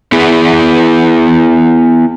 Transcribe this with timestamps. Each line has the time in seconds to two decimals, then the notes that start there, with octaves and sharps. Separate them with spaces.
0.12 B3 E4 G#4